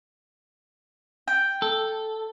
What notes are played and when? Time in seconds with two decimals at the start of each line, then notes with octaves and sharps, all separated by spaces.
1.28 G5
1.62 A4